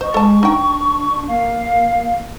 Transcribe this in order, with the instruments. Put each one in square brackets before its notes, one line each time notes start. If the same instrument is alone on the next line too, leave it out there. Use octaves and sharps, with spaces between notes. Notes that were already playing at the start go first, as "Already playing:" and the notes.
[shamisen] C5 [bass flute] D#5 [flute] C#6
[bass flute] G#3 [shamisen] A4 A5
[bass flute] D4 [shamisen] D#4 G5
[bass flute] A#3 [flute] F5